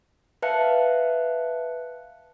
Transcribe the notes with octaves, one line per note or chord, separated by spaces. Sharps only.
B4 E5 F5 A5 F#6 C#7